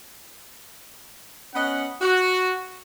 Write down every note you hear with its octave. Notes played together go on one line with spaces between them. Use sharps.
B3 C#4 D#5 F#5
F#4